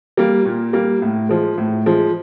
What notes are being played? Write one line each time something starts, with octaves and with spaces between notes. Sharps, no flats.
G3 A#3
A#2
G3 A#3
A2
F3 G#3
A2
F3 G#3